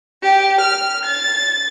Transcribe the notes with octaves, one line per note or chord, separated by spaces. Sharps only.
G4
F6
A6